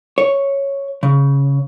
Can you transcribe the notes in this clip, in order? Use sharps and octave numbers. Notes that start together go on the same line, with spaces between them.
C#5
C#3